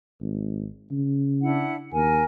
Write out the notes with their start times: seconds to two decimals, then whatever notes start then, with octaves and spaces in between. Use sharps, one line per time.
0.21 G#1
0.91 C#3
1.42 D4 E4 F#5
1.94 D#2 A#4 G#5